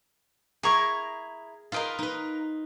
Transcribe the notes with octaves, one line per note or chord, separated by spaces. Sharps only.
E4 G#4 A#4 A#5 C#6
F4 A#4 B4 D#5 F5 G5
D#4 B4